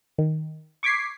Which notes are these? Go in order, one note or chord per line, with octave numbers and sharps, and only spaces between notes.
D#3
C#6 D6 G#6 B6 C7